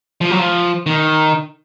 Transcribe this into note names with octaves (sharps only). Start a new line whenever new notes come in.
F3
F#3
F3
D#3